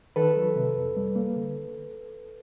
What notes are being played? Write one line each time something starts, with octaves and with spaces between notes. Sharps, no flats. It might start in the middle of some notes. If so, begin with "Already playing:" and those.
D#3 A4 B4
F#3
C3
F2
G3
A#3
D3